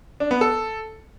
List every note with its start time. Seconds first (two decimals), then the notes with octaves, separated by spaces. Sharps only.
0.20 D4
0.31 B3
0.41 A4